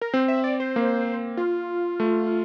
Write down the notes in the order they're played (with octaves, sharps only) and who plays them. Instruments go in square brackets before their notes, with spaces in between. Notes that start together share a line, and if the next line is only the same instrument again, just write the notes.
[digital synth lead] A#4
[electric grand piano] C4 [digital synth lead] C5
[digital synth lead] E5
D5
C5
[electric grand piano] A#3
[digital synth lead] F4
[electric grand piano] A3